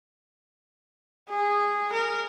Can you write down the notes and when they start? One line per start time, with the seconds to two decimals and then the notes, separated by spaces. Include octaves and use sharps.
1.30 G#4
1.92 A#4